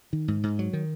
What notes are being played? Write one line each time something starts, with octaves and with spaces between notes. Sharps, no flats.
D#3
G#2
G#2
F#3
D#3